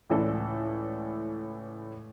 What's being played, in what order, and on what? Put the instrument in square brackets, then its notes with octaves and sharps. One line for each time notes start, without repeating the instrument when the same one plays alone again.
[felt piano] C#2 A2 E3 C#4 A4 D5